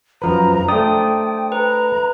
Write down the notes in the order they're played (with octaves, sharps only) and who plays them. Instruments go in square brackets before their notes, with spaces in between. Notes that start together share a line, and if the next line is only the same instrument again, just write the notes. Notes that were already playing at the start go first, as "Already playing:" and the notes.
[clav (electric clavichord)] F#2 F3 B4 [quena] A#5
[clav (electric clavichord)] A3 D4 [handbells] C5 D5 D#6 [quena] G5
[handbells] B4 [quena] A#5